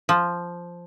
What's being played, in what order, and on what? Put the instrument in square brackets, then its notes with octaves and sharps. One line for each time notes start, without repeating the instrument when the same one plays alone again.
[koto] F3